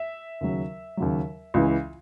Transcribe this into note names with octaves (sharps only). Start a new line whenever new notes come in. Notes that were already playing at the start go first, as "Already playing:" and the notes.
Already playing: E5
D#2 C#3 F#3
D#2 C#3 F#3
C#2 C#3 E3